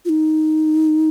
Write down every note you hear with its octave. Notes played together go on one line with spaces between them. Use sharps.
F4
D#4